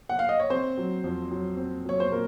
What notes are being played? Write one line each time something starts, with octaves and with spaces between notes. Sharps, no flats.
F#5
F5
D#5
C#5
C4 C5
F#3
F2
F#3
C4
F#3 C#5
C5
A#2 A#4